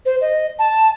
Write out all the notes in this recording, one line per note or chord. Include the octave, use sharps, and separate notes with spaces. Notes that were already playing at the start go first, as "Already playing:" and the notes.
C5
D#5
A5